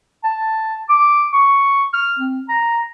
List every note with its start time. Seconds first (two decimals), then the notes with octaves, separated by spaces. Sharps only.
0.24 A5
0.89 D6
1.33 C#6
1.93 F6
2.19 C4
2.49 A#5